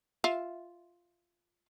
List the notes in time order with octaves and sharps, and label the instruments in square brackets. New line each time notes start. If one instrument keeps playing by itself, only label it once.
[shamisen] F4 E5